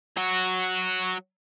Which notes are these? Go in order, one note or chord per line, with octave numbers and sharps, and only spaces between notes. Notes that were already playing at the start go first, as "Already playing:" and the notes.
F#3 F#4